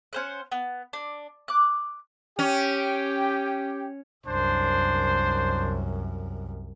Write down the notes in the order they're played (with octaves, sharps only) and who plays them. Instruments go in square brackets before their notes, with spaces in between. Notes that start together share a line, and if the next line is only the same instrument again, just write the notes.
[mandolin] C#4 C5 F#5
B3
D4
D6 F#6
[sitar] C#4 [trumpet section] G4 G5
[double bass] C2 F#2 [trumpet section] D4 C5